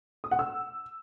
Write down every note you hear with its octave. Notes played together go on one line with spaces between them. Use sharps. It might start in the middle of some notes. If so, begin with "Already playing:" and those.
D#6
F#5
E6